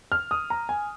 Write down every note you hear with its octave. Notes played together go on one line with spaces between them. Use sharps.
F6
D#6
A#5
G#5